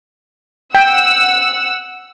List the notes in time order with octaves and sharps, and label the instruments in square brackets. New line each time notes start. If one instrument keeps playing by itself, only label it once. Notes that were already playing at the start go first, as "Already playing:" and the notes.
[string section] F#5 E6 [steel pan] G5